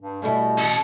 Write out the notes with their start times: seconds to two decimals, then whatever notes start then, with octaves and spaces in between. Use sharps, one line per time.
0.02 G2
0.22 B2 G3 A3 E4
0.58 C#4 A4